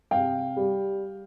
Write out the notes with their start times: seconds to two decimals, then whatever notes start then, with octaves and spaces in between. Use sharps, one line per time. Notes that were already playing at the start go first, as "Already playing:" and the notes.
0.11 C3 F5 G5
0.57 G3